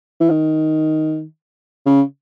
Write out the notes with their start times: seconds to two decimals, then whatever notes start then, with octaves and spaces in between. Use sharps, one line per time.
0.21 E3
0.30 D#3
1.86 C#3